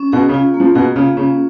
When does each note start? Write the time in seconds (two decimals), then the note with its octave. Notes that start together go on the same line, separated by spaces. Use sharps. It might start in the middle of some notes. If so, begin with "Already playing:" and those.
Already playing: C#4
0.12 B2 G#4
0.29 C#3
0.34 F4
0.54 A#3
0.60 F3
0.75 B2 G#4
0.96 C#3 F4
1.17 C#3 C#4